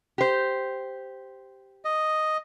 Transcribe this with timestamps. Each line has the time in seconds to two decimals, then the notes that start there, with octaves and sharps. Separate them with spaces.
0.18 G4 C5
1.85 D#5